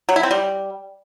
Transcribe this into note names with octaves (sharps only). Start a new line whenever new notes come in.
F#3
E4
C4
G3